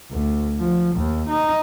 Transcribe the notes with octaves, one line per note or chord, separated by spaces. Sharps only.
D2
F3
D#2
D#4